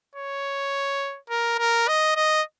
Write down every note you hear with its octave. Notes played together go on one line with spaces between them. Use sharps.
C#5
A#4
A#4
D#5
D#5